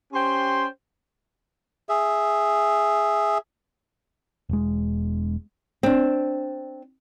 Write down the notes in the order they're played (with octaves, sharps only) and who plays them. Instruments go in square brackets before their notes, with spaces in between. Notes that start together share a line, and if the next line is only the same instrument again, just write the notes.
[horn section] C#4 G4 C5 G5 C6
[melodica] G#4 E5
[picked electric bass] E1 G#3
[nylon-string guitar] C4 D4